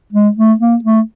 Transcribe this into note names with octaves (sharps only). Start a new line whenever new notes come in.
G#3
A3
A#3
A3